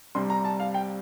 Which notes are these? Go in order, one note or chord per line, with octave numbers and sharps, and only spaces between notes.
C2 C3 G3 C6
A#5
A5
F5
G5